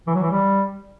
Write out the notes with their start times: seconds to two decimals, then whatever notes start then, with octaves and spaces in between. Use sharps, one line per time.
0.07 E3
0.15 F#3
0.23 E3
0.31 G3